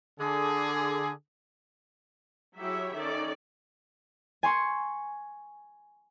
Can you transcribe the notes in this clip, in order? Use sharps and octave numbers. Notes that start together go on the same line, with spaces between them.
D3 G#4
F#3 E4 G4 G#4 C#5 E5
D#3 C#4 A4 D5
G#5 C6 C#6